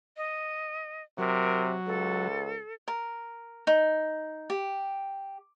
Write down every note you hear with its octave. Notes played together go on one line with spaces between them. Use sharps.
D#5
C3 F#3 A#4
C#2 A4
A#4
D#4
G4